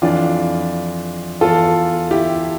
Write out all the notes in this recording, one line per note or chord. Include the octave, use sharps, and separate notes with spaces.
F2 E3 D4 F4
E2 E3 F4 A4
E4 G4